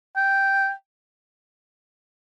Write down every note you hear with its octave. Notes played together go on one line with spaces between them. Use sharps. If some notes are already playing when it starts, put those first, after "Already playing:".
G5